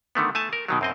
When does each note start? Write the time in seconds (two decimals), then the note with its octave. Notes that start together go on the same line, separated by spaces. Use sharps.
0.15 D3 D#3 A3 B3
0.35 A3 G#5 A5
0.53 A#4
0.68 B2 D#3 F#3
0.81 F#2 C4 D#5